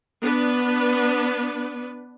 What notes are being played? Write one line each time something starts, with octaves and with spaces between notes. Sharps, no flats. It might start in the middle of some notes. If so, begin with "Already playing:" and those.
B3 D4 B4